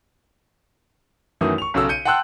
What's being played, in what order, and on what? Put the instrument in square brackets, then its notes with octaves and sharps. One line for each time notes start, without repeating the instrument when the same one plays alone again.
[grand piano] F#2 D#3 E3 A3 F#4 D#6
C#6 F7
B1 C#3 F#4 A4 E6
G6 C#7 D#7
F#5 G5 A5 C6 E6 F#6